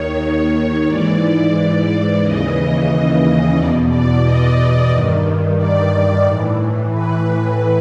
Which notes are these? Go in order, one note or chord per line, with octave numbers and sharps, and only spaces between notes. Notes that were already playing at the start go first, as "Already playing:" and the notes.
Already playing: D#2 D#3 C#5
G#2 E3 D5
D#2 C#3 E3 D#5
E2 B2 D5
D5
D#5
G2 D#3
D5
A2 E3
B4